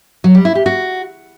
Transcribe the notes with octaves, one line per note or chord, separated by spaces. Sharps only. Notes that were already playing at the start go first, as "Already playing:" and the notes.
F#3
G3
E4
G4
F#4